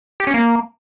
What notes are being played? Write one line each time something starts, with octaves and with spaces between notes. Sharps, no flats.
G4
C#4
A#3